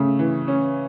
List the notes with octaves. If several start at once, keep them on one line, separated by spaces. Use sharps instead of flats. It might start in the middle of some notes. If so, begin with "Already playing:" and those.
Already playing: C#3 A3
E3
C#4